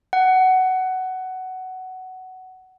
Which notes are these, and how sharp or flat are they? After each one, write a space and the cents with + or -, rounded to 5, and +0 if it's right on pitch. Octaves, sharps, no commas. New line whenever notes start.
F#5 +15